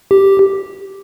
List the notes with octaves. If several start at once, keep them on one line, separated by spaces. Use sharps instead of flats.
G4